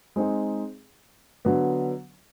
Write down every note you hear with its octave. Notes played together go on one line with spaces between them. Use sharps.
G#3 C4 D#4 G#4
D3 F#3 B3